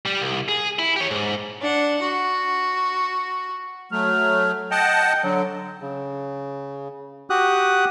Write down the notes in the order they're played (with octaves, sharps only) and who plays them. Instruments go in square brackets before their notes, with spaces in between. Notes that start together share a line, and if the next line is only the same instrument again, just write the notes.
[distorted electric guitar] G3 G4
C2
G#4
E4
G4 C#5
G#2
[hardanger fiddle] D4 F#5
F#4
[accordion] F#3 A3 [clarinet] F6
[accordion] D#5 F#5 A5 [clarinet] G5
[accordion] D3 [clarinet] F#3
[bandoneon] C#3
F#4 G4 D#6 F#6